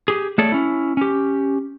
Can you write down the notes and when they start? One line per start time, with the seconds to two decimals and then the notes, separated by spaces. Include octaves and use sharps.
0.08 G4 G#4
0.38 A3 G#4 A4 C#5 D5
0.52 C#4 E4
0.97 C#4 G4